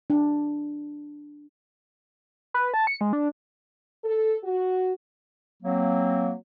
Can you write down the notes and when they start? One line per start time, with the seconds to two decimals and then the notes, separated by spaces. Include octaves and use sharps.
0.10 D4
2.54 B4
2.74 A5
2.87 C#7
3.01 G#3
3.13 D4
4.04 A4
4.43 F#4
5.63 F#3 A#3 C4